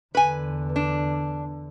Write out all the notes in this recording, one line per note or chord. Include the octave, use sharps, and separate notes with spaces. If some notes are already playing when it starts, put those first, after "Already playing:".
E2 D3 B4 G#5
D4